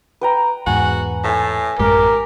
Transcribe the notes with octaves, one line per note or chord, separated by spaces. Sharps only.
B4 G5 A#5
E2 G#2 F#4 G#5
A2 G#5 A5
A1 F#2 G#3 G4 A#4